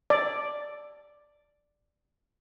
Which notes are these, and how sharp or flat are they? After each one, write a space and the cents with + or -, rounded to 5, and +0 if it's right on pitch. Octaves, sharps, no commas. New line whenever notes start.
D5 +5